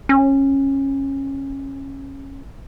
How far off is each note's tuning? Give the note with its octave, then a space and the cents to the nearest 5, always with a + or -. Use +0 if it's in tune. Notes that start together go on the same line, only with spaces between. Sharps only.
C#4 -20